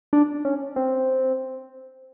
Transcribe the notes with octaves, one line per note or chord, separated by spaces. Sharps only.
D4
C#4
C4